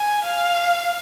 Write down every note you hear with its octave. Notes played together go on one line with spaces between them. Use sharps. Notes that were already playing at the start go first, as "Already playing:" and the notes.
Already playing: G#5
F5